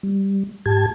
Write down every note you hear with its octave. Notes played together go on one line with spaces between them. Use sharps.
G3
G#2 G4 A5 G#6